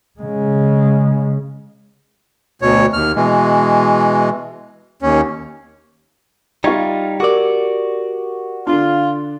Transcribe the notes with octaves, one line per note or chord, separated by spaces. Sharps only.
C#3 G#3
D2 B2 C#5
D#2 F6
B2 E3 G#3
D#2 C#4
G3 D#4 F4 C#6 G#6
F#4 G4 A#4 D5 D6
D3 D4 F4